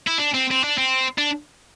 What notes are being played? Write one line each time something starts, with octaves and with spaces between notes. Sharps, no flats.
E4
D4
C4
C4
D4
C4
D4